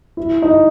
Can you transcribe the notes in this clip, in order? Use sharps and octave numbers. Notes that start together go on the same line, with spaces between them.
E4
D#4